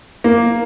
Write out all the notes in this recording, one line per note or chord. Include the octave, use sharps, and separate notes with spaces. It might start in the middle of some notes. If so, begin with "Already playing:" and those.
A#3